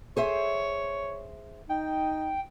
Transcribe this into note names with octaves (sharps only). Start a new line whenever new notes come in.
G#4 C5 C#5 E5
D#4 G5